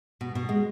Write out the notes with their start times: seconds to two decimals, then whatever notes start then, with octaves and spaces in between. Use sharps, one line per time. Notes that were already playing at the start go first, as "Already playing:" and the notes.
0.21 B2
0.35 B2
0.49 G#3